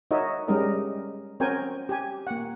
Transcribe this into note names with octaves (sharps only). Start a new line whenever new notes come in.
D#4 F#4 A#4 C#5 D#5 E5
G3 G#3 C#4 D#4 A#4 D#5
C4 C#4 F#4 A#4 G5 G#5
G4 G#5
A#3 F#5